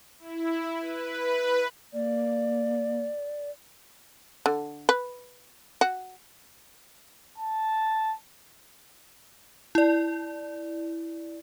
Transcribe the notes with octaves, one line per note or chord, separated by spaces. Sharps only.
E4
B4
A#3 D5
D3
B4
F#4
A5
E4 D5